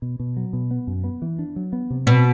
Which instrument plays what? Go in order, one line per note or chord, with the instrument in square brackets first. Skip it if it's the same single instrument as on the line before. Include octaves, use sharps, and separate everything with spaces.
[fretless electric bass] B2
B2
F#3
B2
B3
F#2
B3
E3
D4
F#3
B3
C3
[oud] B2 [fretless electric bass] C4